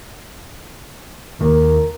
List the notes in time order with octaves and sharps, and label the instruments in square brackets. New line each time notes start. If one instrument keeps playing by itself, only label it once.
[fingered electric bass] D#2 D#3 [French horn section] A#4